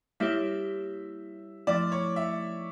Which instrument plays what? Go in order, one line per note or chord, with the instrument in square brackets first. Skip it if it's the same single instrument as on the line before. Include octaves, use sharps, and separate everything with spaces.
[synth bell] G3 A#3 E4 G4 C#5 [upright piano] E5
[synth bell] F3 A3 E4 [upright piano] D5
[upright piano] C#5
E5